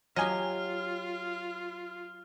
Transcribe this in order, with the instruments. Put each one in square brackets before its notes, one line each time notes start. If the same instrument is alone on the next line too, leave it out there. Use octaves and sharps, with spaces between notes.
[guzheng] F#3 G4 [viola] F4 [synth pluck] D#5 G#5 [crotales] F6